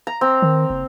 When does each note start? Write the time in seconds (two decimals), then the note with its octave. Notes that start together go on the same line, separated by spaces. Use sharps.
0.07 A#5
0.21 C4
0.42 D#3
0.70 F#1